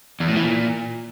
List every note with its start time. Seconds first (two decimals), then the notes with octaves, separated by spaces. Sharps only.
0.20 E2
0.28 A2
0.36 E3
0.43 A#2